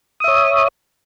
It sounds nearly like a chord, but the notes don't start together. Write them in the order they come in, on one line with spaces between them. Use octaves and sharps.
D#6 E5 C#5